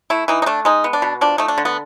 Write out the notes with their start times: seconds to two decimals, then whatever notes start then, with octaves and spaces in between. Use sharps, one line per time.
0.10 A3 E4
0.28 E3 D#4
0.42 D#4
0.46 A3 D4
0.65 G#3 D#4
0.84 B3
0.93 D4
1.02 B2
1.21 F3 D4
1.38 A3 D#4
1.48 D4
1.58 D3
1.65 B3